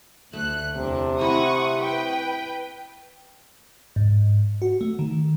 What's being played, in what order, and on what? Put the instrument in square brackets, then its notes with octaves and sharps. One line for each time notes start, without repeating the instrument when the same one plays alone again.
[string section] D2 F#6 [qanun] A3
[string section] E2 D4 [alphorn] C3
[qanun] C4 E4 D#5 [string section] F#5 C#6 D#6
[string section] B4 G5
[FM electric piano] G#2
F#4
A3
D#3